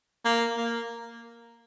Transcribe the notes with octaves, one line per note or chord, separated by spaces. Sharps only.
A#3
A#3